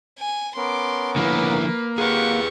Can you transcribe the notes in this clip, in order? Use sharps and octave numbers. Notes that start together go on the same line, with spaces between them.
G#5
B3 C#4 A#4 C6 D6
D3 F3 A#3 E4 B4
F4 G4 G#4 A#4 B4 F#5 C#6